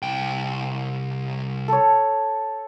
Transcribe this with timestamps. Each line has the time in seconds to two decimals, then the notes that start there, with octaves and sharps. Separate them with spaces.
0.02 C2 G5
1.68 A4 C#5